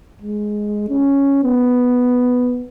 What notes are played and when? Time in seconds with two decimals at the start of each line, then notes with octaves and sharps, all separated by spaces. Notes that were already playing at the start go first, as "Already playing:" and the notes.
0.22 G#3
0.89 C#4
1.44 B3